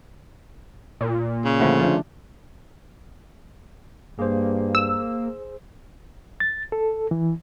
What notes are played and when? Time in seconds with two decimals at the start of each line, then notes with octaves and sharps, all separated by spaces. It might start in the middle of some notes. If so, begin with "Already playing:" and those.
1.01 A#2
1.45 C#3
1.60 D3 F3 A3 E4 F#4
1.80 F3 D4 F4 C5
4.19 G2 A#3 G#4 C5
4.75 E6
6.40 A6
6.72 A4
7.11 E3